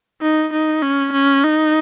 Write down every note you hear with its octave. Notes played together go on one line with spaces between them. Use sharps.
D#4
D#4
C#4
C#4
D#4